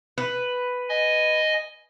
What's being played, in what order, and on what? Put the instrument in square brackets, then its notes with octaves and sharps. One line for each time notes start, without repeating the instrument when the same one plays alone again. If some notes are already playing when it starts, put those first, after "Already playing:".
[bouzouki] B4
[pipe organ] D#5 G#5